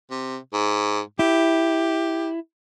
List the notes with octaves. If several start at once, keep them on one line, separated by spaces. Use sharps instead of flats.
C3
G#2
E4 G4